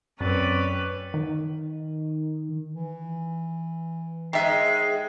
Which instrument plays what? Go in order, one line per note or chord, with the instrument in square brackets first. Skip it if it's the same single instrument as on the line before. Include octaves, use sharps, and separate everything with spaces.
[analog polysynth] F#2 [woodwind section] C4 D5 [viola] C#4 B4
[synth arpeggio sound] D#3
[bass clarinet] E3
[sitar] G#2 G#3 [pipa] D#3 E5 [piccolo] C7